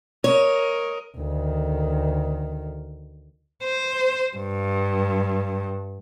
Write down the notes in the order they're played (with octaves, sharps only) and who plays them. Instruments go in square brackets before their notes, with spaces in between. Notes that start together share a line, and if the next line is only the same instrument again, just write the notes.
[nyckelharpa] A#4 D#5 [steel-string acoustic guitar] C#5
[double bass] D2 D#3
[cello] C5
G2